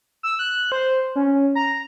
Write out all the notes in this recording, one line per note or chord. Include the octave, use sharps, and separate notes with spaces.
E6
F#6
C5
C#4
A#5